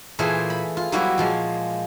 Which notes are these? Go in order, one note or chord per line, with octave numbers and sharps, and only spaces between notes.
A#2 E3 A3 A#3 G#4 C5
B5
F4
F#3 G3 A#3 B3 E4 F#4
A#2 F3 G#3